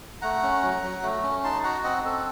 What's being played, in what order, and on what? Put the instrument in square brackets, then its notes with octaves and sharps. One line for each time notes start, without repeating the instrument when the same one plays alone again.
[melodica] A3 F#5 A#5
C#4
F#3
F#3
A3
C#4
D#4 A5 C6
F#4 F#5 A#5
C4 D#5 F#5
C4 A4